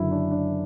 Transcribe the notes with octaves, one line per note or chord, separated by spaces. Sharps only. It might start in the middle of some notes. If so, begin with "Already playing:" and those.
Already playing: F#1 F#2 D3 F#3 E4
D4
D4